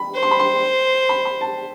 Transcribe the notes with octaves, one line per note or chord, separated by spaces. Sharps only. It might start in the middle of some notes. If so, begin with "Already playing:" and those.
Already playing: B5
C5
C6
B5
C6
B5
B5
A5